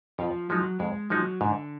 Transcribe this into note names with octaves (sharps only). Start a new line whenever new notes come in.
F2 F3
F3 F#3 G#3 D#4
F2 G#3
F3 F#3 G#3 D#4
G#2 D3